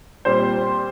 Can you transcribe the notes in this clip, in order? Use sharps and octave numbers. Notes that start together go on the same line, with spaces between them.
A#2 G3 C4 C5